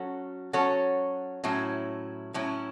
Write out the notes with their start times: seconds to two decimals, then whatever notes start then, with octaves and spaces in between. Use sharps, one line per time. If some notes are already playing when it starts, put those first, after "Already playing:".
Already playing: F#3 C#4 F#4 A4
0.53 F#3 C#4 F#4 A4 C#5
1.44 A2 F#3 C#4 E4
2.34 A2 F#3 C#4 E4